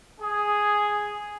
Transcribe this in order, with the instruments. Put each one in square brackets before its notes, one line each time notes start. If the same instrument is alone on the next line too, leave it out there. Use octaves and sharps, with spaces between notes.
[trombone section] G#4